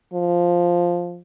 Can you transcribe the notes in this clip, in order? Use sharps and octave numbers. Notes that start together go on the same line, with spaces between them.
F3